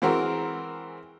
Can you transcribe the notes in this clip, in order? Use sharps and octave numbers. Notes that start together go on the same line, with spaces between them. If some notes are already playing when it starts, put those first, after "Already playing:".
E3 G#3 C4 F#4 A#4